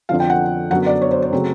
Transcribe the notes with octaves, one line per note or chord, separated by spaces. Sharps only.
F2 D3 F3 F5
G5
F#5
F#2 D3 F#3 B3 F#5
D5
C#5
C5
C5
C#3 F#3 A3 C4